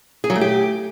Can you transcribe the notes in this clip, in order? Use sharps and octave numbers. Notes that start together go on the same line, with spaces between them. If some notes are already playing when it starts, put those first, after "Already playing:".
G#4
F#3
A3
G4